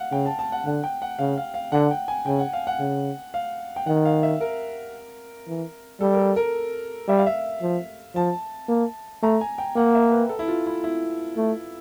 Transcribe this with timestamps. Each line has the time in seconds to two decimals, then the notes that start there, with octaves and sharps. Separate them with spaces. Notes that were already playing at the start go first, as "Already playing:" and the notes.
Already playing: F5 F#5
0.12 C#3 G5
0.26 A5
0.39 A5
0.52 F#5
0.65 D3 F#5
0.84 G5
1.02 F#5
1.19 C#3 F5
1.37 F5
1.54 F5
1.72 D3 F#5
1.91 G5
2.08 G#5
2.26 C#3 G5
2.39 F#5
2.53 F5
2.67 F#5
2.79 C#3
3.34 F5
3.76 G5
3.87 D#3 F#5
4.05 F5
4.23 E5
4.41 A#4
5.48 E3
6.01 G3 A4
6.13 A#4
6.19 A4
6.36 A#4
7.08 G3 E5
7.18 F5
7.26 E5
7.62 F3
8.15 F3 A5
8.69 A#3
9.23 A3 A#5
9.41 G#5
9.58 G5
9.76 A#3 F#5
9.95 E5
10.11 B4
10.29 A4
10.39 E4
10.48 F4
10.66 E4
10.83 E4
11.37 A3